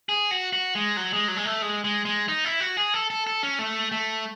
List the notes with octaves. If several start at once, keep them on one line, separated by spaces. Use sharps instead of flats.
G#4
F#4
F#4
G#3
F#3
G#3
F#3
G#3
A3
G#3
G#3
G#3
D#4
E4
F#4
G#4
A4
A4
A4
C#4
A3
A3